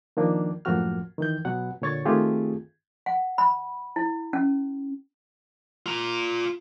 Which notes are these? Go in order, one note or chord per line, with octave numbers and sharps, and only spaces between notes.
D#3 F3 A#3 D4
F#2 A2 F3 A#3 F#4 F6
D#3 E3 G6
B2 F#3 F#5
A#2 D3 C#5 C#6 A6
D#3 A3 C4 F4 G4 G#4
F#5
B5
E4
C#4
F4 A#5